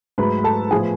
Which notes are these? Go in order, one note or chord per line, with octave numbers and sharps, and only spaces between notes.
G#2 F#3 A3 B4 B5
B5
A4 A5
A2 F3 B3 G#4 G#5